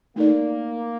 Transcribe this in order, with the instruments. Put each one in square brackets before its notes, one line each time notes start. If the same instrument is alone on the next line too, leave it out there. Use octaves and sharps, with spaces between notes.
[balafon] A3 D#4 A4 D5 [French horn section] A#3